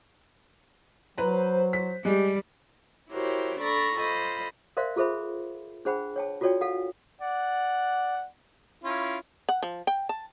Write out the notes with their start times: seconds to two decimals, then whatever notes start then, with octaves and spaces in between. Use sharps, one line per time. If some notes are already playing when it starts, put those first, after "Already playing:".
1.18 F#3 B4 C5 A#5
1.73 B6
2.05 G3 G#3 G4
3.12 E4 F#4 G4 A#4 C5 C#5
3.61 D4 A4 D5 A#5 B5 C#6
3.98 F4 A4 C5 D#5 B5
4.77 A#4 C5 D5 E5 F5 C6
4.96 F4 G#4 A4 C5 E5 B5
5.85 D4 G#4 C5 F#5 G5 B5
6.16 C#5 G5 A5
6.41 F4 F#4 A4 C#5 D5 G5
6.61 A4 F5 F#5
7.21 D5 F#5
8.84 C#4 E4 F4
9.49 F#5
9.63 F3
9.87 G5
10.09 A5